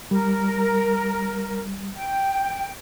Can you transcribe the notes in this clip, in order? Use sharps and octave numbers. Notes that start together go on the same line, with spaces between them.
G3 A#4
G5